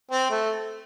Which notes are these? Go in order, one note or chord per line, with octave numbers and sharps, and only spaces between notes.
C4
A3